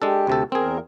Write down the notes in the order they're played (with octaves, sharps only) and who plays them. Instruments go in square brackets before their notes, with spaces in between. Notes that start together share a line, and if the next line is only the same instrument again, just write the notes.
[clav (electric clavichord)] G#3 D4 A4 [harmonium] G4
[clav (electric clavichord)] D2 C3 A4
[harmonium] E2 A#4 [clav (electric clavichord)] C4 G#4